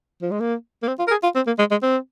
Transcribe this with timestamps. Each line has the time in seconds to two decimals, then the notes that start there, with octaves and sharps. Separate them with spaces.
0.22 F3
0.31 G#3
0.40 A#3
0.83 A#3
0.88 C4
0.99 F4
1.07 A#4
1.11 G#4
1.23 F4
1.36 C4
1.47 A#3
1.59 G#3
1.71 G#3
1.82 C4